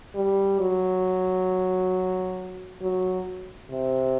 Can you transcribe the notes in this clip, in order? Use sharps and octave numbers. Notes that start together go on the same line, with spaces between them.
G3
F#3
F#3
C3